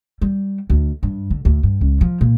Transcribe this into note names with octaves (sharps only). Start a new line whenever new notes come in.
G3
D2
G2
D3
D2
G2
C#2
F3
A#2